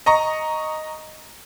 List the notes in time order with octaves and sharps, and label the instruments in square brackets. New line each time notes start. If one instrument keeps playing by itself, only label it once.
[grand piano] D#5 A#5 C#6